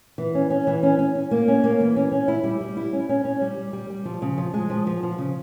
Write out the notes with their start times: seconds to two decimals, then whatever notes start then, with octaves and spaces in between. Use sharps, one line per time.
0.18 E3
0.35 C#4
0.50 C#4
0.67 E3
0.83 C#4
0.99 C#4
1.15 C#4
1.31 A#3
1.48 C#4
1.64 A#3
1.80 E3
1.96 C#4
2.12 C#4
2.28 E4
2.44 G3
2.61 G3
2.77 E4
2.93 C#4
3.09 C#4
3.25 C#4
3.41 G3
3.58 G3
3.73 G3
3.90 G3
4.05 F3
4.22 C#3
4.38 F3
4.54 G#3
4.70 F3
4.87 F3
5.03 F3
5.18 C#3